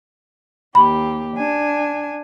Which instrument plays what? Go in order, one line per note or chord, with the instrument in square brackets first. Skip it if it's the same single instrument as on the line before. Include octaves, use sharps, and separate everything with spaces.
[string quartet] D#2 G4 [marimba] B5
[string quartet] D4 G#5